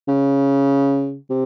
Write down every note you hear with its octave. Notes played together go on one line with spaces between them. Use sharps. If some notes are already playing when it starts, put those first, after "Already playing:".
C#3
C3